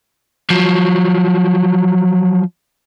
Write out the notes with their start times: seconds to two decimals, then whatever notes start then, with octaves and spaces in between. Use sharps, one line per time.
0.50 F3 F#3